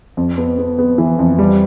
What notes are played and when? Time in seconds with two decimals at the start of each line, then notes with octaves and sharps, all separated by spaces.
0.17 F2
0.38 B3
0.58 B3
0.79 B3
0.98 E3
1.19 F2
1.39 G3